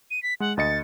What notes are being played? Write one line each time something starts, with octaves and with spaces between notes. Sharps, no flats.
D#7
B6
G#3 F#5
D2 D#5 A6 C#7